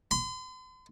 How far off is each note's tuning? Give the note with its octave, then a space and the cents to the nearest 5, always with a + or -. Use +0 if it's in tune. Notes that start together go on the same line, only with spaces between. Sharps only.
C6 -45